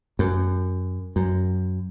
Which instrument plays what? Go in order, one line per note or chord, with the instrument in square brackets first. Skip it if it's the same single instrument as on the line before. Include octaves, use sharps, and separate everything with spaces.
[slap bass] F#2
F#2